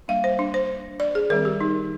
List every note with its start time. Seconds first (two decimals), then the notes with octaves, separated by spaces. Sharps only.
0.08 G3 A#3 D4 F5
0.24 C5
0.39 D4
0.54 C5
1.00 D5
1.15 G#4
1.30 D#3 G3 C4 A#4
1.45 G4
1.61 D#4